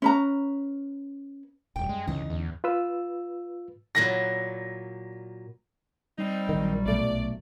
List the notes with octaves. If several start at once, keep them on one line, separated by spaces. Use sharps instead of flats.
C#4 B4 A#5
E1 F#2 G3 G5
G#3
C#2 D3 E3 C#4 D#4
E2
F4 B4 E6
A#2 F#3 E4 A#6
G3 C4 D#4
A#1 D#3 F#3
B1 A3 D5